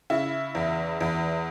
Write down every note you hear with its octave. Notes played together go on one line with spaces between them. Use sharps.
C#3 E4
E2
E2